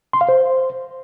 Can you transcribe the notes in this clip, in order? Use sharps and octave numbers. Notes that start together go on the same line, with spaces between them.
C6
F5
C5